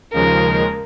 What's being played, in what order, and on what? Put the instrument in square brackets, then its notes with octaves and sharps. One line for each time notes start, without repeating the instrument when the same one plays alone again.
[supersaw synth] D#2 C#3 F3 G#3 [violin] A#4